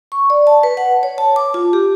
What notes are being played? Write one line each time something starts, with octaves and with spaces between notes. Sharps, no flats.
C#6
D5
A5
B4
F#5
C#5
A5
D6
F4
G4